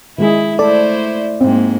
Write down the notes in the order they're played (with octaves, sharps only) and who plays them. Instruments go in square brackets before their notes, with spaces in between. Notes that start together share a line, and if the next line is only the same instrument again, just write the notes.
[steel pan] D#3 G#3 G#4 [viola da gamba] E4
[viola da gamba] A3 E4 C5 [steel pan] A4 [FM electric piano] D5
[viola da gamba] G#2 A#3 [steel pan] C4